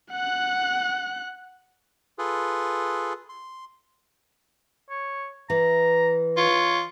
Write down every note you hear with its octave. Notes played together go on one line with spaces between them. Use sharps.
F#5 F#6
F4 G#4 A4 B4
C6
C#5
E3 A#5
F4 C#5